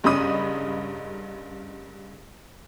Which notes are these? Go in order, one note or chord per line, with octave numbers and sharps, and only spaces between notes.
F#1 G2 C#3 D#5 B5 D#6